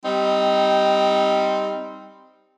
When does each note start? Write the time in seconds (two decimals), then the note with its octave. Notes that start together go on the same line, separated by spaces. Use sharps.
0.04 G3 C4 D#4